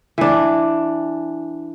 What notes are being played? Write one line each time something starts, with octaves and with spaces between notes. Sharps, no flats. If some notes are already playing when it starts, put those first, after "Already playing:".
E3 D4